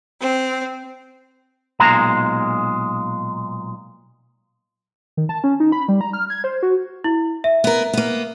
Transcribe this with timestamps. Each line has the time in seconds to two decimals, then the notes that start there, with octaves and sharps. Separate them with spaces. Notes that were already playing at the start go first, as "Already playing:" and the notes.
0.21 C4
1.80 B1 A#2 G#3 A#5
5.17 D#3
5.29 A5
5.44 C#4
5.60 D#4
5.72 B5
5.88 G3
6.01 A#5
6.13 F6
6.30 G#6
6.44 C5
6.63 F#4
7.04 E4
7.44 E5
7.64 B3 A#4
7.93 A#3 B3